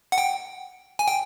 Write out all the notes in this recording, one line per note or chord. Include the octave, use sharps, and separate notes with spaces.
F#5
G5
G#5
G5